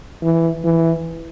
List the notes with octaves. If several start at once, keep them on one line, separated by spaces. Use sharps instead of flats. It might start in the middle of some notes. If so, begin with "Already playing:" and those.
E3
E3